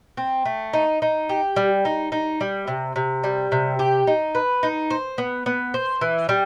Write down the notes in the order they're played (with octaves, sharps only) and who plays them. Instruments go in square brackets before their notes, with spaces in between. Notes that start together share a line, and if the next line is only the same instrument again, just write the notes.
[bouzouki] C4
A3
D#4
D#4
G4
G3
D#4
D#4
G3
C3
C3
G3
C3
G4
D#4
B4
D#4
C5
B3
B3
C5
E3
G3